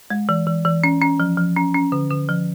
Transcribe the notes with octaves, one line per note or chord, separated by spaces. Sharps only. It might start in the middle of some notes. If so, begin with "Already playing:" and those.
G#3
E3
E3
E3
C#4
C#4
F3
F3
C#4
C#4
D3
D3
F3